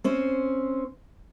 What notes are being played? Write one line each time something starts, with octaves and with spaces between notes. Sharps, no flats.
C4 C#4 C5